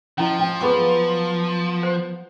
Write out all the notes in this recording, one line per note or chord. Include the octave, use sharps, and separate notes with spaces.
F3 C#4 E4 D#5
G5
F#3 B3 G#4 B4 C#6
C5